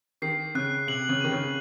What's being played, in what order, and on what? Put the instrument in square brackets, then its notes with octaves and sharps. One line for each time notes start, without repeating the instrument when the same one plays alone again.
[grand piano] D#3 [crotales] C7
[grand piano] C#3 [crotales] F#6
[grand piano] C3 [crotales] F#7
[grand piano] C#3
[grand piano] D#3 [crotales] D#7
[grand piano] C#3